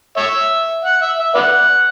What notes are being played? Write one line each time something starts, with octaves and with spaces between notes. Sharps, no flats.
C#5 E5
F#5
E5
E5
B4 D5 F#5